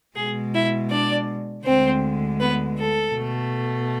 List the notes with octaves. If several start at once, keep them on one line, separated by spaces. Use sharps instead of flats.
B2 G#3 G#4
E4 E5
D4 D5
D2 D3 G#3 C4 C5
B3 B4
A4
B2 A3